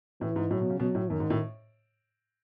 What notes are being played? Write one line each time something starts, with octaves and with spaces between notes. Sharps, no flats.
A2 E3
G#2
A2 F#3
B2
C#3
B2 F#3
A2
F#2 D#3
G#2
A2